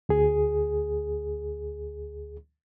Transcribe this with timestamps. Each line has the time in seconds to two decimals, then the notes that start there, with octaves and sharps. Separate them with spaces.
0.09 D2 G#4